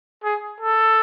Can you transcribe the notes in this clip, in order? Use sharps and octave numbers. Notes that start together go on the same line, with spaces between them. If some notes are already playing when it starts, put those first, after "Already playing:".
G#4
A4